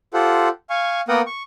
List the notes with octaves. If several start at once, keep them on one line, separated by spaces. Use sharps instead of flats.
F4 G4 A4 C5 F#5
F5 G#5 C#6
A#3 B3 A#4 F#5 G5 D#6
C#6